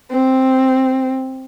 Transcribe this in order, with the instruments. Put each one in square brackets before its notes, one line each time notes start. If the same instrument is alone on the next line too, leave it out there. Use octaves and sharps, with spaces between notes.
[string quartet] C4